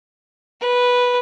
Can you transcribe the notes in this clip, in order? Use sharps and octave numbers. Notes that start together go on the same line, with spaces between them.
B4